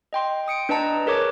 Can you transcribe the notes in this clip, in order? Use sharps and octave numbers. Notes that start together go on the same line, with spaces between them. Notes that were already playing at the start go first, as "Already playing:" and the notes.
D#5 G5 C6
G5 D#6 C#7 D7
D4 B4 D#5 A5 A#5
G#4 A#4 B4 C#5 D6